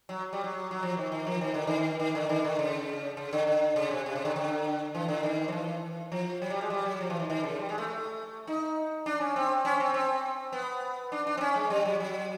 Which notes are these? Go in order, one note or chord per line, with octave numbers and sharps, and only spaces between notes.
F#3
G3
F#3
F#3
F3
D#3
D#3
F3
D#3
D3
D#3
D#3
D3
D#3
D3
C#3
C#3
D3
D3
C#3
C3
C3
C#3
D3
D3
E3
D3
D#3
F3
E3
F3
F#3
G3
G#3
G3
F#3
F3
E3
D#3
D#3
C#3
G3
G#3
A3
A3
D#4
D4
C#4
C4
C#4
C4
C4
B3
D4
D4
C4
C#4
G#3
G3
F#3
F#3